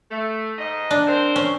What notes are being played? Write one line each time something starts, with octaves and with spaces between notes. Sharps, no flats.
A3
G#2 D#5
D4
C4 A#4 C5
C#4